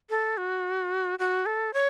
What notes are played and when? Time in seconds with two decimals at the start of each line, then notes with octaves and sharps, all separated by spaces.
0.10 A4
0.37 F#4
1.19 F#4
1.46 A4
1.74 C#5